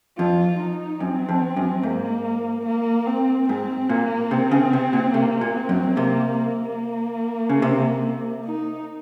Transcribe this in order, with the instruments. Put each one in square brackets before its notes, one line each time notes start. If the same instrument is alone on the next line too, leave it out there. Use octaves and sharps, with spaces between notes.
[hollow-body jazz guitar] F2 [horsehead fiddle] F4
[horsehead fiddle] D#4
[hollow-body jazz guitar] F#2 [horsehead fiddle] C4
[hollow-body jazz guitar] F2
F#2
[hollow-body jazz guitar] G#2 [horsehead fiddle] A#3
[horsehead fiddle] A#3
C4
[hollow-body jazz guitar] G#2 [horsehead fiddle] C4
[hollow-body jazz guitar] A#2 [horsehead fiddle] A#3
[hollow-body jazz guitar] C3 [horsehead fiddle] C4
[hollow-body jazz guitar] C#3
C3
A#2
[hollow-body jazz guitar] C3 [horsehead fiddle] A#3
[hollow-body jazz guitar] A#2
[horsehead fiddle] C4
[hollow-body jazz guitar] F#2
[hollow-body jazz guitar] C3 [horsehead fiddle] A#3
[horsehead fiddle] A#3
[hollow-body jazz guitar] C#3
C3
[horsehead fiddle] D#4